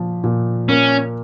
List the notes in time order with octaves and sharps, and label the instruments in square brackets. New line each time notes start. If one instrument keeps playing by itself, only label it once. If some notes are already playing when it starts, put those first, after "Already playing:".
Already playing: [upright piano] A#2 F3
A#2
[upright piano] A#3 [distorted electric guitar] C#4